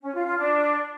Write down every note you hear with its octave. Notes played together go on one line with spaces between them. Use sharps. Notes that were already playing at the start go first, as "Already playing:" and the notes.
C#4
F4
F4
D4